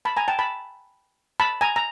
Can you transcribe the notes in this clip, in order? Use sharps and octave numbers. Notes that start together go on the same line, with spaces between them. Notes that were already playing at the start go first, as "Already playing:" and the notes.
A5 B5
G#5 A#5
G5 A5
A5 B5
A5 B5
G#5 A#5
A#5